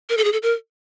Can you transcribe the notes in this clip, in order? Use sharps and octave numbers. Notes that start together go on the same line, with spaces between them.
A#4
A4
G#4
A4
A#4